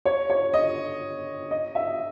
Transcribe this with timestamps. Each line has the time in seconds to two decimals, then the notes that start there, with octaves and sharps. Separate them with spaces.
0.05 C#5
0.30 C#5
0.54 D#5
1.51 D#5
1.75 E5